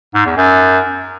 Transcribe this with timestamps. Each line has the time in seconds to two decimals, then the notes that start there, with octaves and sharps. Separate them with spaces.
0.14 G#2
0.26 E2
0.37 F#2